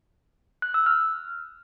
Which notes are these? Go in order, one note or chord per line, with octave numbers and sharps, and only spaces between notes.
F#6
E6
F6